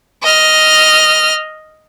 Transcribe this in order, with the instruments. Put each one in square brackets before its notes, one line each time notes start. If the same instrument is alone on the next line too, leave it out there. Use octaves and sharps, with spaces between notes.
[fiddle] D#5 F6